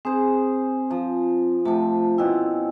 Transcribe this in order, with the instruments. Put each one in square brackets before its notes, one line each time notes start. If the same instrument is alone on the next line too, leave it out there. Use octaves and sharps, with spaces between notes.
[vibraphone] C4 [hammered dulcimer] G#4 C5
[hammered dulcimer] F3
[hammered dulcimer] C3 F3 [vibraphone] A3 A5
[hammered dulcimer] B2 C4 C#4 [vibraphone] E4